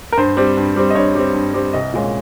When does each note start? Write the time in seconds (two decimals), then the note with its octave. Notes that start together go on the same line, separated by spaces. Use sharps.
0.12 A#4
0.18 G2 C5
0.37 G3 C4
0.57 G2
0.76 G3 C4
0.90 D#5
0.95 G2 C#5
1.15 G3 C4
1.34 G2
1.54 G3 C4
1.73 C2 D#5
1.94 A#2 G#3 C#4